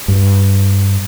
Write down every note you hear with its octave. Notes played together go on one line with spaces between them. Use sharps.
G2